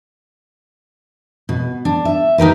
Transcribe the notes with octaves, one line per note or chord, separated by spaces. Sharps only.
B2
D4
E5
D#4 G4 A#4 B4